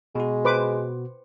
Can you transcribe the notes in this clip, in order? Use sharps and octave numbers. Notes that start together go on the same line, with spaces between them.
B2 G#3 F#4
B4 C5 D6